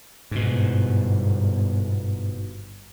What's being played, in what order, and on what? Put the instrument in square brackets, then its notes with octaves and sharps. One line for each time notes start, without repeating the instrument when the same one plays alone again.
[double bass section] G1 [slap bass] G#2 B2